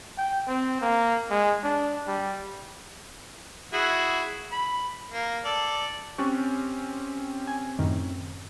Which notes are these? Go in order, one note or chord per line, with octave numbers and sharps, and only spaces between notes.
G5
C4
A#3
G#3
D4
G3
E4 F#4 G#4
B5
A#3
A4 D5
C4 C#4 G4 C#6 F#6 A6
G#5
F#2 A2 D#3